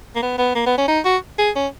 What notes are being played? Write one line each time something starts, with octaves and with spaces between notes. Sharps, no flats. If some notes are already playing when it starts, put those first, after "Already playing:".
A#3
B3
B3
A#3
B3
C#4
D#4
F#4
G#4
C#4